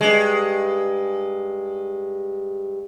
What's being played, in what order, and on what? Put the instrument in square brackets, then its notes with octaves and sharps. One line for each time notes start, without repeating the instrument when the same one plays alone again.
[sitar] G2 G#3